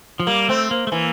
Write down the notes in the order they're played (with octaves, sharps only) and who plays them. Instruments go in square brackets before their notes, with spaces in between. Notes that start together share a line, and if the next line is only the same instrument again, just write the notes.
[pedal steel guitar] F3
[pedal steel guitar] G3 [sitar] A#3
[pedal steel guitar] A3 [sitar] C4
[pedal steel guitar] A#3
A3
[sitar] E3 [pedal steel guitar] A#3